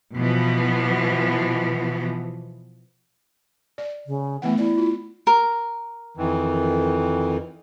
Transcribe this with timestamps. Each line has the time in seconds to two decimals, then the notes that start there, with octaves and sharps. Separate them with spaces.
0.15 B2 E3 F3 B3
3.78 D5
4.07 C#3
4.42 E3 A3 B3 F#5
4.59 E4 D5
4.78 F4
5.27 A#4
6.17 F2 D#3 E3